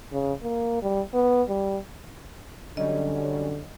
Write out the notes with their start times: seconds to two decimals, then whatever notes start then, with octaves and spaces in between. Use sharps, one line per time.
0.13 C#3
0.43 A#3
0.82 G3
1.14 B3
1.49 G3
2.77 D3 F#3 G3 C#4 D#5